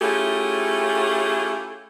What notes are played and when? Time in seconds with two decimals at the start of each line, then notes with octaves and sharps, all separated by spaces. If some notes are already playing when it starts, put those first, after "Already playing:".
0.02 A3 C#4 E4 F4 G4 G#4